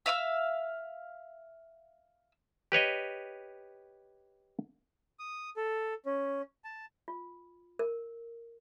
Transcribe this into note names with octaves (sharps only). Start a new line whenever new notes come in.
E5 F5 D#6 E6
G4 B4 C#5 D#5
D#6
A4
C#4
A5
F4
A#4